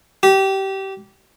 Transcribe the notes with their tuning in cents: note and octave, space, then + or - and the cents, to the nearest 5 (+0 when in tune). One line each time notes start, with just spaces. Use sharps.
G4 -20